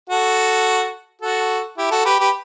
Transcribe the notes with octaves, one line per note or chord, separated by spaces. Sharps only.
F#4 A4
F#4 A4
E4 G4
F#4 A4
G4 B4
G4 B4